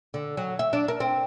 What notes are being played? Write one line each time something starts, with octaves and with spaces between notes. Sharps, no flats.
D3
F#3
E5
D4
A#4
C4